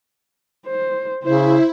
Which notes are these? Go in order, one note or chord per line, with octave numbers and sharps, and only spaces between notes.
C5
C#3 E4 C5